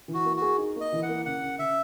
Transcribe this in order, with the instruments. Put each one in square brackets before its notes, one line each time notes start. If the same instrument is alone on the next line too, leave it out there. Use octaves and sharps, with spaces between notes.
[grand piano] E3
[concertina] F#4
[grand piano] A#3
[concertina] F#4 [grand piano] G#4
[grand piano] D#4
[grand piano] A#3 [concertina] D#5
[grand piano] E3
[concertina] F#5
[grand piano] A#3
[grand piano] C#3 [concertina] F#5
[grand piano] C#3
[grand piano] C#3 [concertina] E5